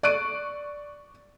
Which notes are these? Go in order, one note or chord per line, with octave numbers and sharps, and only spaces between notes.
D5 C#6 F#6 D7 D#7